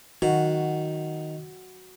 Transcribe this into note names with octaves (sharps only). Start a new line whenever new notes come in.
D#3 F#4